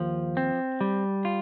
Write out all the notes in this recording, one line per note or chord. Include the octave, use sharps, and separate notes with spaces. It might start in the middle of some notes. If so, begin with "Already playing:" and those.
Already playing: D#2 F3
C4
G3
F4